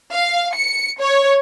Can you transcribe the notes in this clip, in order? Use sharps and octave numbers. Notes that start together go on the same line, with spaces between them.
F5
C#7
C#5